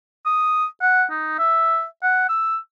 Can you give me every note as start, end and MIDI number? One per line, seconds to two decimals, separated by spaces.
0.26 0.65 87
0.82 1.05 78
1.11 1.37 63
1.38 1.84 76
2.03 2.29 78
2.29 2.57 88